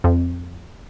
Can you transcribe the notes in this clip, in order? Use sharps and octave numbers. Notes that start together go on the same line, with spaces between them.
F2